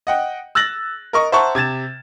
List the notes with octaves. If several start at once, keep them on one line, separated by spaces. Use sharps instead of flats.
D#5 F#5 G5
E6 F#6 A6 A#6 F#7
A#4 D#5 C#6
C5 E5 F#5 A5 A#5 C#6
C3 G#6 A6 E7